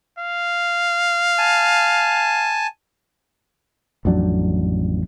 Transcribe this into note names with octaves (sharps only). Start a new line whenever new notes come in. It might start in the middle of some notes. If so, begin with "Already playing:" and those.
F5
G#5 A5
A1 F2 F#3 D4